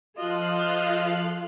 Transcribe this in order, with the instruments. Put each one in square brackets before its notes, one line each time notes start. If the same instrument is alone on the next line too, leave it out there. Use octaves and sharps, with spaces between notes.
[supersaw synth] F3 F5 F#6 [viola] F4 A4 [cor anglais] D#5